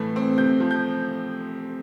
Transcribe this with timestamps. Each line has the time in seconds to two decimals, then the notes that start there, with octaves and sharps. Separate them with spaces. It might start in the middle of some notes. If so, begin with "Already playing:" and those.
Already playing: A2 E3 A3
0.16 C4
0.38 C3 G6
0.60 F3
0.71 G6